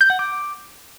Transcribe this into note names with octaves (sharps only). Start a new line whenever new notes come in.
G6
F#5
D6